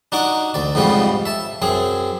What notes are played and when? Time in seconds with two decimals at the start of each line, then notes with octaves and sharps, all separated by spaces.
0.12 D4 D#4 F#4 C#6 D6
0.54 D2 D5
0.75 F2 G#2 C#3 F3 G3 B3
1.25 E5 A5
1.62 F#2 C4 G#4